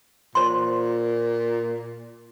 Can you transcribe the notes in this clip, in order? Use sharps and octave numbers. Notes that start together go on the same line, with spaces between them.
A#2 C5 C6